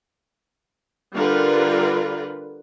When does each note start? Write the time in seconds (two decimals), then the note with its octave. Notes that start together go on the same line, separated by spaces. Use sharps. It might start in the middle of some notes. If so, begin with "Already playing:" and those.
1.14 D3 G3 F4 A#4 B4